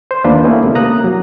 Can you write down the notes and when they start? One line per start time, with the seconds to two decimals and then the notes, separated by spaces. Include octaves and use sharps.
0.11 C5
0.24 D#2 D#3 A#3 D4 F4 B4
0.43 A#3 B3 C#4 E4 A4
0.62 C#2 C3
0.75 A#3 A#5 D#6 F#6
1.04 F#3